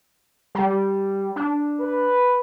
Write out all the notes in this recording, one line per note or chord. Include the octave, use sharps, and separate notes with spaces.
G3
D4
B4